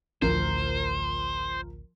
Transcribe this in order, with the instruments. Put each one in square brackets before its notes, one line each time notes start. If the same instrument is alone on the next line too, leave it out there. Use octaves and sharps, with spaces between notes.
[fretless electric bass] A1 D2 [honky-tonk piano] F3 A#4 [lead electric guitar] C5